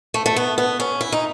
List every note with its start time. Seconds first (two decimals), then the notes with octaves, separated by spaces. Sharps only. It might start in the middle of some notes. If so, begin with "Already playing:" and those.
0.14 A3
0.26 A3
0.36 B3
0.58 B3
0.80 C#4
1.01 E4
1.12 D#4